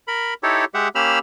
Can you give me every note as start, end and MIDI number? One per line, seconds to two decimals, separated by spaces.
0.08 0.34 70
0.08 0.34 83
0.43 0.65 63
0.43 0.65 64
0.43 0.65 67
0.43 0.65 69
0.43 0.65 73
0.74 0.88 56
0.74 0.88 67
0.74 0.88 76
0.74 0.88 78
0.95 1.19 58
0.95 1.19 61
0.95 1.19 67
0.95 1.19 83
0.95 1.19 88
0.95 1.19 89